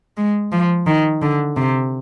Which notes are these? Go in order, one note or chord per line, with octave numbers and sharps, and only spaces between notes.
G#3
F3
D#3
D3
C3